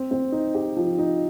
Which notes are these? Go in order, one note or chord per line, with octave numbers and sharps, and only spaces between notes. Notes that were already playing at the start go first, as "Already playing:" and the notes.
Already playing: C4
C4
D#4
G4
F3
D#4